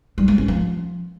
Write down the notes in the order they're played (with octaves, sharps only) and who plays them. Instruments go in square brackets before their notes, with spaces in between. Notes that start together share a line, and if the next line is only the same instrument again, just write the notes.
[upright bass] G3
G#3
C#4
F3